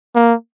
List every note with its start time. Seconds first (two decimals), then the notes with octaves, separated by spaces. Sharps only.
0.15 A#3